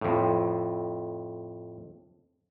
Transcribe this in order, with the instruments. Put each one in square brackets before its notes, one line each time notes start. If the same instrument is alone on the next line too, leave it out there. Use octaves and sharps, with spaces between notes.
[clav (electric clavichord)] F2 A2